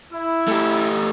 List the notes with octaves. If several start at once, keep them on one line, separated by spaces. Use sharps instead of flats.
E4
A3 G4